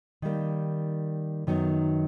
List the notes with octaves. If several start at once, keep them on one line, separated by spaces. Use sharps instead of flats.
D#3 G3 A#3
F#2 D#3 F#3 B3 D#4